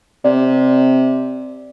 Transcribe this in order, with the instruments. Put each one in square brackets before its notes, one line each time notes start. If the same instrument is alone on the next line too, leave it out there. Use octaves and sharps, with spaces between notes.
[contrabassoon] C3 [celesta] D5